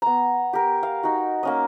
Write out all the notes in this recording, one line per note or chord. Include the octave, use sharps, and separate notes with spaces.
B3 A#5
G4 A#4
F5
D#4 F#4
A#3 C#4 D#5